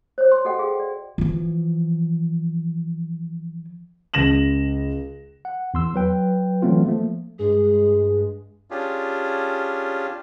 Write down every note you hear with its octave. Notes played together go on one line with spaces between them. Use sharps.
C5 C#5
C6
F#4 A4 D#5 F#5 G5
G#4 F5
D5
E3 F3
C#2 A#6 E7 F#7
F#5
E2 C6 E6
F#3 B4 G5
E3 F#3 A3 B3 C4 F4
F3 A3 A#3
G2 G#3 G#4
C#4 D4 F4 G4 G#4